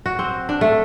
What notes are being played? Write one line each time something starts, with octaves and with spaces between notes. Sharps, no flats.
F#4
C4
D4
A3